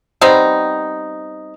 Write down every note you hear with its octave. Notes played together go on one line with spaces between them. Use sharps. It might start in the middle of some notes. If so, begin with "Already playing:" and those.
G3 B3 C4 D#4